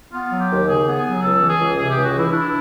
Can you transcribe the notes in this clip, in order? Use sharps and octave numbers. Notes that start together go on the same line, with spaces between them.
B3 F4
F#3
G4
D#2
C#3 G#4
B3
G#4
F#3
C#2 A4
E3
G#4
C#2
C3 G#4
C#2 G4
F#4
E3 E4
D4 E4